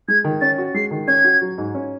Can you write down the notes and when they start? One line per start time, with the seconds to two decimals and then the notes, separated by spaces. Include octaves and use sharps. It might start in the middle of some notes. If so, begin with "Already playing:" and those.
0.08 G#3 G#6
0.24 D#3
0.41 C#4 A6
0.58 F#4
0.74 G#3 C7
0.91 D#3
1.08 C#4 G#6
1.24 F#4
1.41 F#3
1.58 G#2
1.75 C#4